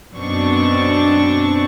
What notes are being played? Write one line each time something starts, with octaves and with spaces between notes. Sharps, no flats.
F#2 B2 C4 D4 C#6